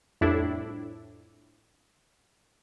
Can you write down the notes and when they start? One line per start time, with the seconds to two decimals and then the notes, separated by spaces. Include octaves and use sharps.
0.21 C2 F2 A2 D4 E4